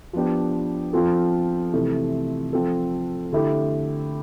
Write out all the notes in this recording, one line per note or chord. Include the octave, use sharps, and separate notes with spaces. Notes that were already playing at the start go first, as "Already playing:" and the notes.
F3 B3 D4 G4
F3 C4 F4 A4
C3 E3 A3
F3 C4 F4 A4
D3 A3 E4 G4